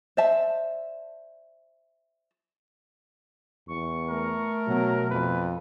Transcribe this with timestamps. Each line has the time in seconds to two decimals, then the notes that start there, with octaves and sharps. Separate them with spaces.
0.17 C5 D5 E5 A5
3.68 E2 C#6
4.09 A3 A#4
4.67 B2 F#3
5.10 F2 B4